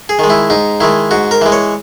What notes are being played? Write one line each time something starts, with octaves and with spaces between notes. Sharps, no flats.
G#4
D#3 G#3
E4
G#2 D#4
D#3 G#3 E4
G#2 F#4
A#4
E3 G#3
C#5